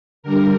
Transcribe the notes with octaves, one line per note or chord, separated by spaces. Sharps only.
D3 G3 A#4